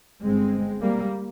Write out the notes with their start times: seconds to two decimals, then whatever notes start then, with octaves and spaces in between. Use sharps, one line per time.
0.23 G1 G2 G#3 C4
0.81 G3 A#3